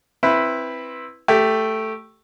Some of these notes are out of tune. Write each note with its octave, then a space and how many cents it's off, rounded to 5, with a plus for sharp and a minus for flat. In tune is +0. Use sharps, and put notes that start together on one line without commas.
C4 +10 E4 +0 B4 +0
A3 +0 G4 -10